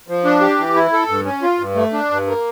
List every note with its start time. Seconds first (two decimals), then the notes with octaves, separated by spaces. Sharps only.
0.08 F3
0.24 D4
0.41 G4
0.59 E3
0.75 E4
0.93 A4
1.09 G2
1.25 C#4
1.42 F4
1.59 G2
1.76 A3
1.93 D4
2.10 G2
2.27 A#3